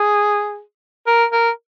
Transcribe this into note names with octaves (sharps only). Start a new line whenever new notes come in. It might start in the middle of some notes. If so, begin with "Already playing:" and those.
Already playing: G#4
A#4
A#4